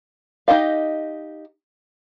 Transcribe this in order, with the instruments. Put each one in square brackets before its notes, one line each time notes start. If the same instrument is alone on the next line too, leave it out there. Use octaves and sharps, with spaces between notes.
[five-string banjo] D#4 G4 D#5 F5